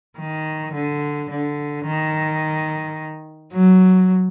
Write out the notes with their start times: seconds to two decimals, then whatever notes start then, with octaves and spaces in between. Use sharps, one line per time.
0.18 D#3
0.74 D3
1.31 D3
1.86 D#3
3.53 F#3